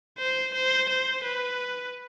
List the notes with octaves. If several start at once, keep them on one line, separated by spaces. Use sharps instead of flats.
C5
C5
C5
B4